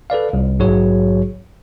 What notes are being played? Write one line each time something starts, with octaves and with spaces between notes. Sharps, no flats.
A4 B4 D5 F5
C2
A#1 G#2 F#3 F#4 G#4 C#5